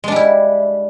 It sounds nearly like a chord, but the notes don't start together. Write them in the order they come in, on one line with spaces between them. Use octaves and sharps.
G#3 D4 G3 E4